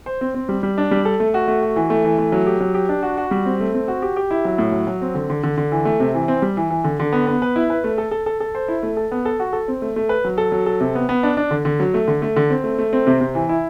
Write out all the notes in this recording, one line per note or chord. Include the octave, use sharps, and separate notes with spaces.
C5
C4
C4
G3
G3
D4
G3
A4
A3
F#4
A3
F#4
E3
A3
E3
A3
F#3
G4
F#3
G4
D4
F#4
F#4
G3
C4
A3
C4
F#4
G4
G4
E4
F#3
A2
F#3
F#3
C4
D3
D3
D3
D3
E3
A3
C3
E3
C4
G3
E3
E3
D3
D3
B3
B3
B4
E4
B4
A3
A4
A4
A4
A4
C5
E4
A3
A4
B3
A4
F#4
A4
C4
A3
A3
B4
F#3
A4
F#3
A4
C3
B3
B3
D4
D4
D3
D3
F#3
A3
D3
A3
D3
C4
A3
A3
C4
C3
C3
E3
E4